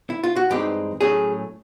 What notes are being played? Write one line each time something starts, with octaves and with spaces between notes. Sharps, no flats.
E4
F4
F#4
G2 E3 G#3 C4 D#4 G4
A2 F#3 A3 C#4 G#4